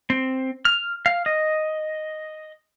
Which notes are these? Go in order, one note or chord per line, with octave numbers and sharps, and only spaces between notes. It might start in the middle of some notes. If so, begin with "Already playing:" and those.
C4
F6
F5
D#5